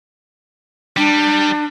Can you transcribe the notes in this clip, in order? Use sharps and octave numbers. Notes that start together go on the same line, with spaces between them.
G3 D4